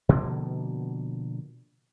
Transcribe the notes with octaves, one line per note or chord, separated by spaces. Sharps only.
B2 D3 F3 A#3